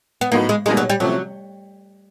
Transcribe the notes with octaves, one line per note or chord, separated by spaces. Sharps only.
B3
A2 F#3 A#3 B3 D#4
G#3
B2 G3 G#3 A#3 D#4 G#4
F#3
G3
C3 F3 F#3 A3 C#4